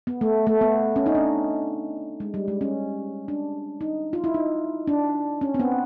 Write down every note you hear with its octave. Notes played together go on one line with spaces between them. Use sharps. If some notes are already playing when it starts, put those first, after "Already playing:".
B3
A3
A3
B3
C#4
D#4
D4
G#3
G3
G#3
C#4
D4
D#4
F4
E4
D#4
D4
C#4
C4
B3